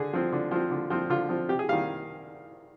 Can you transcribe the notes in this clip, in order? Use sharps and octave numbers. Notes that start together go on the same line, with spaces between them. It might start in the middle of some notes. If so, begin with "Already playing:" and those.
Already playing: D3 G#4
F3 C4
D3
F3 C4
D3
F3 C4
D3 F4
F3 C4
C3 G4
G#4
D#3 G3 F5